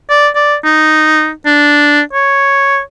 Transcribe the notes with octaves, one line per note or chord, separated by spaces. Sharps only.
D5
D5
D#4
D4
C#5